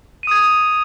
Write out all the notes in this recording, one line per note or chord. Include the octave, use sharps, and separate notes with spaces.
D#6 G#6 D#7